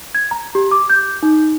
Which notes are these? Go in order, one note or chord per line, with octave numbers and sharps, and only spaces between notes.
G#6
A#5
G4
D6
G6
D#4